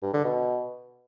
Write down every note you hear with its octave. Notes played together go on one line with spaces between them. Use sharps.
G2
D3
B2